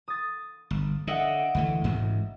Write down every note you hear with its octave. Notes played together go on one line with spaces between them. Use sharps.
D#6 A6
G1
D3 D#5 E5 F#5
D7
D2 E3 A3
A1 D2 G#2